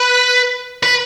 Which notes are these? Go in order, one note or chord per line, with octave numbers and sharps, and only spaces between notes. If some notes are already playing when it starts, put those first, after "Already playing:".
Already playing: B4
B4